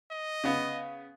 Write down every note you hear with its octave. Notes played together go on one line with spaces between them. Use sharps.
D#5
C#3 B3